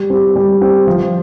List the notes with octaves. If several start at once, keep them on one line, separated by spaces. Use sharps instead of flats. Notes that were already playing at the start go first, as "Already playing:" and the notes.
Already playing: G3
C4 G4
G3
C4 G4
F3